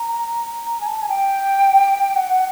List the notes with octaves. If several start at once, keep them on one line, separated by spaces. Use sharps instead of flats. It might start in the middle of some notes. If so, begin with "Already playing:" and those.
Already playing: A#5
A#5
G#5
A5
G#5
G5
F#5